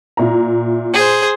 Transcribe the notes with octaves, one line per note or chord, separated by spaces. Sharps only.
A#2 E4 A#5
G#4 C5